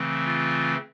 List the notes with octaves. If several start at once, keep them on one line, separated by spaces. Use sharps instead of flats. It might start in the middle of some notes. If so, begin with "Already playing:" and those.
Already playing: C#3 E3 A3 C4
F4